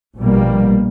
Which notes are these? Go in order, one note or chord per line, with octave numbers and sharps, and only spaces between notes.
A#1 B2 G3 A#3